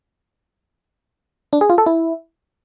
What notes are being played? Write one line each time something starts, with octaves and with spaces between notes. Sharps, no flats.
D4
G#4
F4
A4
E4